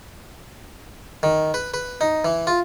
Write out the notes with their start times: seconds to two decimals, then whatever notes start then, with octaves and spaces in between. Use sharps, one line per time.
1.23 D#3
1.54 B4
1.74 B4
2.01 D#4
2.25 E3
2.47 F4